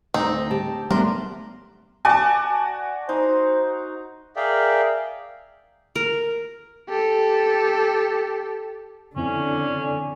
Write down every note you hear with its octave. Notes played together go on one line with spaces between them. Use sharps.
D2 C4 D#4 A#5
G4 A5
G3 A3 B3 D4 A#4 B4 C6
F#4 D5 G#5 A5
D#4 C5
G#4 A#4 D5 E5 F5 G5
A#4
G4 A4
F2 D3 C4 C#4 E4